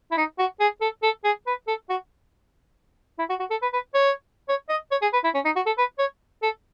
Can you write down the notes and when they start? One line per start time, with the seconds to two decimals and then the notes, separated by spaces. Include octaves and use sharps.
0.11 E4
0.17 D#4
0.39 F#4
0.60 G#4
0.81 A4
1.03 A4
1.24 G#4
1.47 B4
1.67 A4
1.89 F#4
3.19 E4
3.30 F#4
3.40 F#4
3.51 A4
3.62 B4
3.73 B4
3.94 C#5
4.49 C#5
4.69 D#5
4.91 C#5
5.02 G#4
5.13 B4
5.24 E4
5.34 C#4
5.45 D#4
5.56 F#4
5.66 A4
5.78 B4
5.99 C#5
6.42 A4